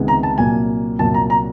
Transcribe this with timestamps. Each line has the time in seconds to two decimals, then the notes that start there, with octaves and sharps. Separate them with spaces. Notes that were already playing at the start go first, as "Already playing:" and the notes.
Already playing: C#2 C3 D#3 G#3 B3
0.08 A#5
0.23 A5
0.38 C2 A#2 F#3 A#3 G#5
0.99 C2 A#2 F#3 A#3 A5
1.14 A#5
1.30 A#5